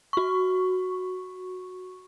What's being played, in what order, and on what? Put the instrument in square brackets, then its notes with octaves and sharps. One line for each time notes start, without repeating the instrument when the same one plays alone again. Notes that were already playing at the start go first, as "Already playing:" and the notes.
[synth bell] F#4 C#6